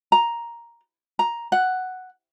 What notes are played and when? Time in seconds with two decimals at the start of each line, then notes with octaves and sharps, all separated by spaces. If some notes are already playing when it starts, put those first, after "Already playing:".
0.12 A#5
1.19 A#5
1.52 F#5